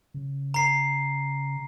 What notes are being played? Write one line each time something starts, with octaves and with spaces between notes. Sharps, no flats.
C#3
A#5 C7